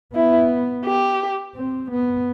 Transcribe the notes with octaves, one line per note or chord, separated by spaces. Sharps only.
B3 E4
G4
C4
B3